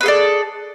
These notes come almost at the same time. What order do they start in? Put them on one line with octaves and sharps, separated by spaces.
B4 G#4 A4 D5